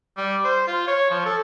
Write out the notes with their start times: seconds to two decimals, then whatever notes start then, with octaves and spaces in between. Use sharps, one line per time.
0.17 G3
0.44 C5
0.68 F4
0.87 C#5
1.11 F3
1.25 A4